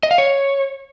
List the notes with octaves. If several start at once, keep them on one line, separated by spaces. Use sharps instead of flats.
D#5
F5
C#5